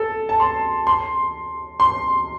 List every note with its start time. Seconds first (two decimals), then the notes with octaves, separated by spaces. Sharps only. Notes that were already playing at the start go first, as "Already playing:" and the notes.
Already playing: A4
0.29 A5
0.40 C6
0.87 C6
1.80 C6